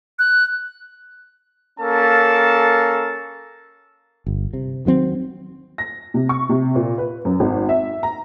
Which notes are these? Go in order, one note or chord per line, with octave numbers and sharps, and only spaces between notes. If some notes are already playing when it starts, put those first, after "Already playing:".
F#6
A#3 C#4 A4 A#4 A5
G1
C3
D#3 F#3 C4
A#6
C3
C#6
C3
A#2
B4
F#2
G#1
E5
A#5